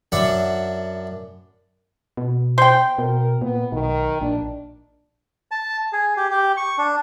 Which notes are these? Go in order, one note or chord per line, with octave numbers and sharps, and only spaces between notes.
F#2 D4 E5 F#5
B2
C5 G5
B2 A#4
A#2 B3
B1 D#3
A#1 D4
A5
G#4
G4
G4
C#6
D4